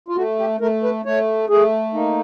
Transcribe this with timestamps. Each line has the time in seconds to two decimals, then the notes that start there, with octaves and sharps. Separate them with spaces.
0.08 F4
0.16 A3 F#4
0.39 G4
0.60 A3 A#4
0.83 B4
1.05 A3 C#5
1.49 A3 G#4
1.94 A#3 D#4